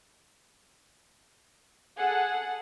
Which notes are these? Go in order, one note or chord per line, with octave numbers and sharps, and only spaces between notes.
G#4 A4 F#5